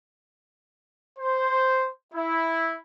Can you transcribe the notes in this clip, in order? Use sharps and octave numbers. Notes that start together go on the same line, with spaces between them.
C5
E4